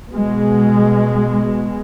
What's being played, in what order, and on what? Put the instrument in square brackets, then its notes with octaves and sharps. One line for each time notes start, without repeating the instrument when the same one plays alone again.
[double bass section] B2 G#3